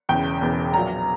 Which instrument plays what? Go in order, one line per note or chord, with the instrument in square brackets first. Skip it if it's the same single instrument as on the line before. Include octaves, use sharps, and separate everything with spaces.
[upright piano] E1 E2 C#3 G5
E1 E2 C#3
A#1 A#2 F#3 A#5